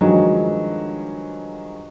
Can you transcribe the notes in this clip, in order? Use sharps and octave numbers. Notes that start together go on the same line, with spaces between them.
G2 D#3 F3 F#3 G#3